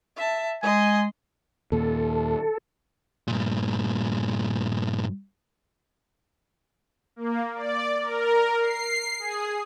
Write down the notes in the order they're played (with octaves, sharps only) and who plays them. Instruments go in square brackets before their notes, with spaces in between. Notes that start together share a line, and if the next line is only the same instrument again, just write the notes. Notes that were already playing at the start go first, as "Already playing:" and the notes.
[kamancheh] E5 A5
[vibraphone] G#3 [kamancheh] D#5 C6 [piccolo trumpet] G#5
[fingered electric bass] D#2 A#2 [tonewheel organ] A4
[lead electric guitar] G2 A#2
[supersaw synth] A#3
D5
A#4
C7
G#4